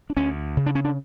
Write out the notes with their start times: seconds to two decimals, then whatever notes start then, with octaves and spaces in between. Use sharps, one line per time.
0.10 D4
0.17 D2 C#4
0.57 C#3
0.66 D4
0.75 C#4
0.84 D4